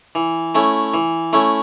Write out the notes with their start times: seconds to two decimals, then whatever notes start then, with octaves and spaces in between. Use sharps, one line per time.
0.15 E3
0.55 A3 C#4 E4
0.94 E3
1.33 A3 C#4 E4